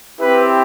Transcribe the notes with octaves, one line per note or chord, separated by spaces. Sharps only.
C4 E4 G4 B4